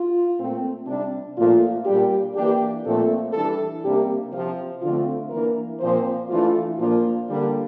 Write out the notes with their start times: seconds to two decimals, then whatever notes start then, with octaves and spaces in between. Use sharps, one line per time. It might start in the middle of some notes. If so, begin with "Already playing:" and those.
Already playing: F4
0.38 A#2 A3 C4
0.87 C3 G3 D4
1.37 A#2 F3 A3 F4
1.85 A#2 G3 D4 G4
2.35 E3 A#3 D4 G4
2.85 A#2 F3 A3 C4 A4
3.33 E3 G3 D4 A4
3.83 C3 G3 A#3 D4 G4
4.33 C3 F3 C4 F4
4.82 D3 F3 A3 C4 F4
5.31 E3 A#3 D4 A#4
5.80 A#2 F3 C4 C5
6.30 E3 A3 D4 F4
6.79 A#2 F3 A#3 D4 F4
7.28 D3 G3 A#3 D4